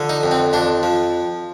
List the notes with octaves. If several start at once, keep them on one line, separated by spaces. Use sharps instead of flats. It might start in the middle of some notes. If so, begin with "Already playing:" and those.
Already playing: D3 F3
D#4
F2
C4
F2 D4
F3